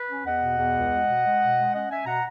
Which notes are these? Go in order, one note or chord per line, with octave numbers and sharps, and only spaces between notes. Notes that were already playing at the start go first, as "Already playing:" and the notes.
Already playing: B4
C#4
E2 D#5 F#5
B2
E2
C#2
G#3
B2
G#3
B2
G#3
C#4 D#5 F#5
C#4 E5 G#5
B2 F#5 A#5